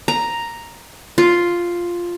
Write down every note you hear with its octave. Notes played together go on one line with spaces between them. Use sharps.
A#5
F4